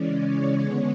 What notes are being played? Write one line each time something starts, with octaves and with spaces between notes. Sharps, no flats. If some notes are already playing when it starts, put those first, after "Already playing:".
Already playing: C#3 E3 G#3 C#4 D5
C#5
D3 G#3 B3